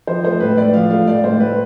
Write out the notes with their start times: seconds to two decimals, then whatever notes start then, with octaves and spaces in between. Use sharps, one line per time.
0.07 F3 C5
0.24 A3 C5
0.40 A2 B4
0.57 A2 D5
0.73 F3 F5
0.90 A3 F5
1.07 A2 D5
1.24 A2 C5
1.40 A2 B4